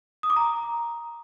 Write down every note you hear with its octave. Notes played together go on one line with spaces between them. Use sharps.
D#6
D6
A#5